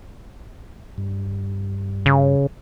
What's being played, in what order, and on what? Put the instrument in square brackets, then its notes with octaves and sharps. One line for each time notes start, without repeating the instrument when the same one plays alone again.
[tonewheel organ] G2
[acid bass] C#3